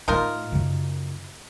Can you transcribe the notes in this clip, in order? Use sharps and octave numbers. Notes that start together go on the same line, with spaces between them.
A2 A3 D#4 F4 A#4
F#2 C#3